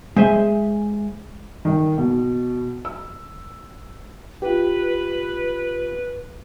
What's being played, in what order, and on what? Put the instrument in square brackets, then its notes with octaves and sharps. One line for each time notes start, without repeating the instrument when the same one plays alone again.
[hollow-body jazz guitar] G#3 C5 E5 G#5 C6
[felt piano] D#3
B2
E6
[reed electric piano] F4 G4 [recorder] B4